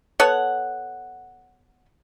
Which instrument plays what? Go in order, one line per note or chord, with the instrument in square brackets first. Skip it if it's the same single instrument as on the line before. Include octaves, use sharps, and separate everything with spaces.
[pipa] B3 A4 C#5 F#5